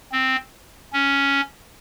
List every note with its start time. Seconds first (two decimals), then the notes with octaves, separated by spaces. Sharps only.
0.12 C4
0.93 C#4